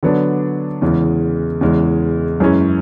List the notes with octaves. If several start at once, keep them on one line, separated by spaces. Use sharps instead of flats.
D3 F#3 B3 D4
E2 C#3 E3 G#3
E2 C#3 E3 G#3
F#2 E3 G#3 C#4